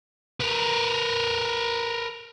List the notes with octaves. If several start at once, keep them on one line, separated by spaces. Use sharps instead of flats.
A#4 B4